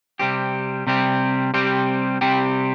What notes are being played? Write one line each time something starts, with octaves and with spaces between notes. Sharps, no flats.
C3 G3 C4 G4
C3 G3 C4 G4
C3 G3 C4 G4
C3 G3 C4 G4